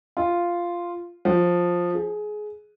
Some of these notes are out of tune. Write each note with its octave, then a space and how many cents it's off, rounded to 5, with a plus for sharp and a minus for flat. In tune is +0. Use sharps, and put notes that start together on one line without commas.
F4 -5
F3 +10
G#4 +20